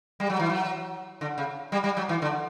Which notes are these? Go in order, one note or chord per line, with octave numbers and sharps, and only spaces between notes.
G3
F#3
E3
F#3
D3
C#3
G3
G3
F#3
E3
D3